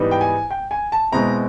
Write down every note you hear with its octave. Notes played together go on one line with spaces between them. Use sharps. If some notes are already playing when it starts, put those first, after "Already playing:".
Already playing: G#2 E3 G3 B3 D#4
G5
G#5
G5
G#5
A5
B2 G#3 C4 E4 A#5